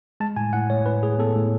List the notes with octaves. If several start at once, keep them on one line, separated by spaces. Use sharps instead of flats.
G#3 A5
A2 G#5
A2 F#5
A2 C#5
A2 B4
A2 G#4
B3 A4
A2